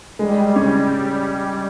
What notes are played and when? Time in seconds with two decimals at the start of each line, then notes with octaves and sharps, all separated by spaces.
0.19 G3 G#3
0.56 C#4